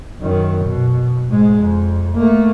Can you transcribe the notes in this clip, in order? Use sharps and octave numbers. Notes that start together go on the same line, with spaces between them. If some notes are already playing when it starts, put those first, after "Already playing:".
F#2 D#3
B2
G#2 G#3
F2
A3 A#3